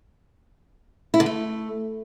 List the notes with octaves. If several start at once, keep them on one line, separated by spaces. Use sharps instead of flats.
E4
D3
A3